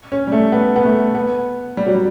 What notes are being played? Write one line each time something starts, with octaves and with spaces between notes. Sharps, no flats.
C#4
G3
A3
B3
B3
A3
B3
G3
F#3
G3